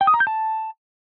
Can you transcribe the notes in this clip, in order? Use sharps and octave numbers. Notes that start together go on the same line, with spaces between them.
G5
D#6
A#5
G6
A5